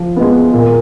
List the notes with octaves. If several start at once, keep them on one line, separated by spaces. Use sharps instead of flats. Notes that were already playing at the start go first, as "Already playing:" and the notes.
Already playing: F3
G#3 B3
A#2